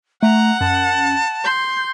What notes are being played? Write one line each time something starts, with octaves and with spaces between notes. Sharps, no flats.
A3 F#5 A#5
F#2 A5
C6 G6